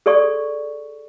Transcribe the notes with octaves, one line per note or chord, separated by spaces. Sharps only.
G#4 A4 D5 C#6